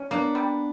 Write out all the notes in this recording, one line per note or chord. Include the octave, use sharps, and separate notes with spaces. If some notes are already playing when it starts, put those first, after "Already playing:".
Already playing: C#4
A#3 B3 D4
G3